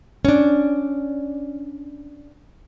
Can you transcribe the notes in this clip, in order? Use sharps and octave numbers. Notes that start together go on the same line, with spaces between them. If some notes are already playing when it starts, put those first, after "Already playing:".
C#4 D4